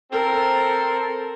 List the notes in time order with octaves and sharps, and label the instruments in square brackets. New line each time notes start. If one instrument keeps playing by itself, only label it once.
[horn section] C4 A4 [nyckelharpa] A#4